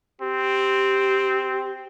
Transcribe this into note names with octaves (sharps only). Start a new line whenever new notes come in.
C4 G4